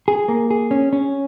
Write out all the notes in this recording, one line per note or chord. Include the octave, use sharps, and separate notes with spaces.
G#4
A#3
G#4
C#4
C#4